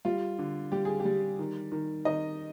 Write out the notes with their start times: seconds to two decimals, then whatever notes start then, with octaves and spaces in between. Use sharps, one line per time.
0.05 G3 F4
0.39 D3
0.72 G3 G4
0.85 G#4
1.00 G4
1.05 G3
1.39 D#3
1.72 D#3
2.05 D#3 D#5